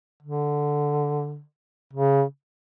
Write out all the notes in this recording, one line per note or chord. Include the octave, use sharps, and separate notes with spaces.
D3
C#3